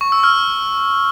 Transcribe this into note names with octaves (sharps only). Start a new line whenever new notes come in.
C#6
E6
F6